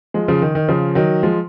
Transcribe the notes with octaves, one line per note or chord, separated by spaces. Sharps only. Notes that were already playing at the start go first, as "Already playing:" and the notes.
F3 G#3
C#3 F3
D#3
D#3
C#3 F3
D#3 F#3
F3 G#3